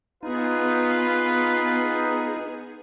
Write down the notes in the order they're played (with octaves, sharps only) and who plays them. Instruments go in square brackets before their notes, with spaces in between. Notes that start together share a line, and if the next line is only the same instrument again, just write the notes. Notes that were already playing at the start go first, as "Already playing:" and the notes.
[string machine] B3 G#4 [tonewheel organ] D#4 [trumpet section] F4 B4